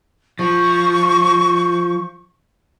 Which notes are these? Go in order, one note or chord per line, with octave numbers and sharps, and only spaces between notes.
F3 C#6